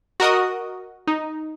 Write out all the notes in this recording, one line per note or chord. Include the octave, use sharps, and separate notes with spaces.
F#4 A#4 D#5 D#6
D#4